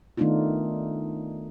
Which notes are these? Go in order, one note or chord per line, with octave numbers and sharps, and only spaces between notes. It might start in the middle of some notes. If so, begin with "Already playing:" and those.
D#3 A3 B3 D4 D#4 F4